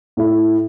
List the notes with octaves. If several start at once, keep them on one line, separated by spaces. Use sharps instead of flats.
A2 A3 E4